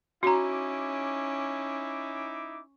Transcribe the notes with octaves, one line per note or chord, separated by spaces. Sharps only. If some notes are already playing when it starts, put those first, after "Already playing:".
C#4 D#4 E4 F#4 A#5 D6